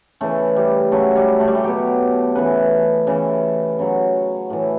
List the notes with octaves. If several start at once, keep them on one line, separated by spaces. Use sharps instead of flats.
C#3 E3 A3
G3
C#3 F#3 A3
G3
A3
G3
A3
B2 F#3 G4
C#3 E3 B4
C#3 E3
C#3 F#3
A2 E3